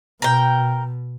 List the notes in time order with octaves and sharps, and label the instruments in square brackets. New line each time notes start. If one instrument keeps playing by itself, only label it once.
[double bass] B2 [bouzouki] A#4 G5